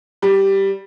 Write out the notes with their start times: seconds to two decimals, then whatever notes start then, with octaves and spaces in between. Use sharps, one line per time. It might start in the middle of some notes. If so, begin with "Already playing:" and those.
0.22 G3